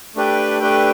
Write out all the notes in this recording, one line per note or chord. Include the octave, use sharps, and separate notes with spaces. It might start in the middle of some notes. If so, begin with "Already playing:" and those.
A3 D4 G4 B4 G5
A3 D4 G4 B4 G5